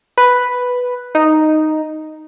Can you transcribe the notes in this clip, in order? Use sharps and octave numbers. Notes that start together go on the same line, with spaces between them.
B4
D#4